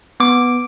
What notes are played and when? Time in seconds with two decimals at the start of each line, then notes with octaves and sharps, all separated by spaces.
0.20 B3 D6